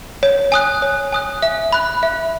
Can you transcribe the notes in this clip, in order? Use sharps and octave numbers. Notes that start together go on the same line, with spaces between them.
C#5
G#5 D#6 F#6
C#5
G#5 D#6 F#6
E5
B5 F#6
E5